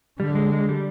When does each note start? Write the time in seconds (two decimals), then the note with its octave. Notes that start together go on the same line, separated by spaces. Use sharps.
0.19 D3 G3
0.35 G#3
0.52 G#3
0.69 G3